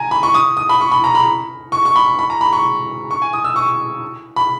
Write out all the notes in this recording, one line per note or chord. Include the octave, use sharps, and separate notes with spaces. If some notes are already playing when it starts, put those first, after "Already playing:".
Already playing: G#5 A#5
B5
C#6
D#6
D#6
B5
C#6
B5
A#5
B5
C#6
C#6
B5
B5
A#5
B5
C#6
C#6
G#5
D#6
E6
C#6
B5